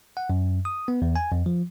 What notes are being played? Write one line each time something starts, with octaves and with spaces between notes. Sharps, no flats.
F#5
F#2
D#6
B3
E2
G#5
F2
F3